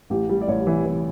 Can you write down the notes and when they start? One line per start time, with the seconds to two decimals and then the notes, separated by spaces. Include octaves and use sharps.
0.10 A1 G4
0.29 G3
0.42 D5
0.48 A1 C#5
0.67 E3
0.86 E3